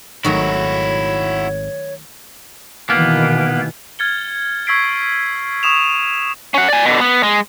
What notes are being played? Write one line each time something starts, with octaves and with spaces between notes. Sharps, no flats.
G#1 D#3 F#3 A3 E4 F#4 C#5
B2 D#3 E3 A#3 B3
F6 G#6 A6 C#7 G7
C#6 E6 G#6 B6 C7 D7
C#6 D#6 E7 F7
C#4 F#5
D5 G#5
B2 D3
B3
G#3